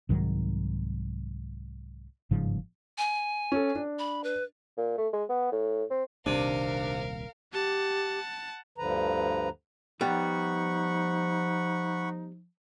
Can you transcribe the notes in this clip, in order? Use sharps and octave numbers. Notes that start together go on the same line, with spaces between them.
C2 G#2 D#3 F#3
G1 G#2 C#3 F3
G#5
C#4 A4
D4
B5
B4
A#2
A3
G#3
B3
A2
C4
D#1 C2 C3 D#3 D4 A#4 F5
G4 F#5 A5
D2 G2 D3 F3 B4 A#5
F3 G3 B3 D#4 F#5 B5 C#6